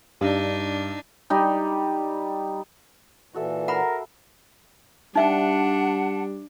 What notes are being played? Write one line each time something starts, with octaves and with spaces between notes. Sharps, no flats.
G2 D4 D#4
G3 D#4
A#2 E3 F#4 A4 E5
A#4 F#5 A#5 B5
G3 D4 D#4 E5 F#5 G5 A5